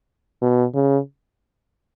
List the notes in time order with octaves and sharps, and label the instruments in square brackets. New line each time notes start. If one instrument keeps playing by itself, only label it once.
[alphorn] B2
C#3